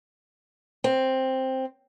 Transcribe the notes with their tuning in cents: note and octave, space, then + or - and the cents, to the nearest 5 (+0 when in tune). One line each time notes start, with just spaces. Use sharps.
C4 +5